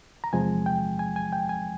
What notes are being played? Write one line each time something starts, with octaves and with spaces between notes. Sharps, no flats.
A#5
E2 C3 F3 G#3 G#5
G5
G#5
G#5
G5
G#5